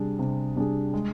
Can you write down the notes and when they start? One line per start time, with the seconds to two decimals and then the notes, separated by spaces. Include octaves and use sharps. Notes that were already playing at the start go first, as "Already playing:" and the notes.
Already playing: C3 G3 D4 G#4
0.19 C3
0.56 G3 D4 G#4
0.94 G#3